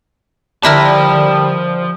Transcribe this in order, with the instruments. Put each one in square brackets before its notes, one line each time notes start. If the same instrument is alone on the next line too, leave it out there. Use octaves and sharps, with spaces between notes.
[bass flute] D3 [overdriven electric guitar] F3 A5 [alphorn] G3 [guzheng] D4 E4 A#4